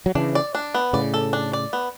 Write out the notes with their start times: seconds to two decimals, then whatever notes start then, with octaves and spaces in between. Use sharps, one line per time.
0.06 F#3
0.15 C#3 E3 D4
0.35 D5
0.55 D4
0.74 B3
0.93 A2 C#3 D5
1.14 A4
1.33 D4
1.53 D5
1.73 B3